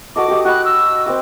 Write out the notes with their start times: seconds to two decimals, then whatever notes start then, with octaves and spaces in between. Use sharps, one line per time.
0.16 F#4 A4 D#5 D6
0.28 F#4 G4 D#5
0.45 F#4 D#5 B5 F#6
0.65 E6
1.06 C4 G5 D6